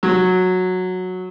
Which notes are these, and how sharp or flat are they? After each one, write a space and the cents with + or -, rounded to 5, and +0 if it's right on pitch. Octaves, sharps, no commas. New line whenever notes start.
F#3 -10